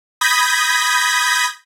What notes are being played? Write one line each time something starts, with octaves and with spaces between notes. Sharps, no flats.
B5 D#6 G6 G#6 A#6 B6